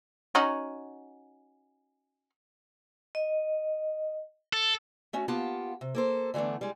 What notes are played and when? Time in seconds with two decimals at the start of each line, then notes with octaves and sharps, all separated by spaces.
0.35 C#4 D#4 F#4
3.15 D#5
4.53 A4
5.13 A3 C#4 F#4
5.28 A#3 B3 F4 G4 F#5 A5
5.81 C3
5.95 A#3 A4 C5
6.34 D3 E3 A3 B3 D4
6.61 G3 G#3